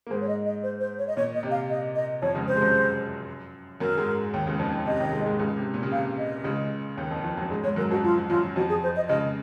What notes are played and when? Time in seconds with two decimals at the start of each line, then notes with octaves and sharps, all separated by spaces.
0.07 A#3
0.10 G#2 G#3 C5
0.21 C#5
0.28 D#5
0.46 D#5
0.63 C5
0.80 C5
0.98 C#5
1.07 D#5
1.16 A#2 C#5
1.34 D#5
1.43 C3
1.51 F5
1.70 D#5
1.96 D#5
2.22 F2 F3 C#5
2.35 C#2 C#3
2.48 C3 C5
2.56 G#3
2.62 F#2 F#3
3.80 F#2 F#3 A#4
3.97 G#2 G#3
4.34 D#2 D#3
4.46 C#2 C#3
4.59 F2 F3
4.72 F2 F3
4.86 C3 D#5
4.99 D#2 D#3
5.13 G#2 G#3
5.26 G#2 G#3
5.39 C#2 C#3
5.57 C3
5.74 A#2
5.83 C#3
5.92 C3 F5
6.18 D#5
6.44 C#2 C#3
6.97 D#2 D#3
7.11 F2 F3
7.24 F2 F3
7.37 F#2 F#3
7.50 G#2 G#3
7.64 G#2 G#3 C#5
7.76 F#2 F#3 A#4
7.91 F2 F3 F#4
8.04 F#3 F4
8.16 F3
8.29 F#2 F#3 F4
8.56 F2 F3 F#4
8.69 G#4
8.83 C5
8.96 D#5
9.09 C#2 C#3 D#5